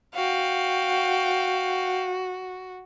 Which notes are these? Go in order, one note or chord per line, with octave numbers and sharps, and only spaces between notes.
F#4 F5 G5